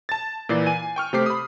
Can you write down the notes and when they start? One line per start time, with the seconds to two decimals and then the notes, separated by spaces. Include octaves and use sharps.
0.09 A5 A6
0.49 A#2 E3 D5 C7
0.66 G#5 D#7
0.96 G5 C#6 F6
1.13 C3 A3 G4 C5 D6 C7
1.26 B5 D#6